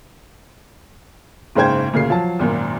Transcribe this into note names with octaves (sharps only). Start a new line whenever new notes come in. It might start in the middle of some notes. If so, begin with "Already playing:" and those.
F#1 G#2 C#3 C5 G5 G#6
D2 A#2 C#3 C7
F3 F#3 A5
G#1 F#2 A#2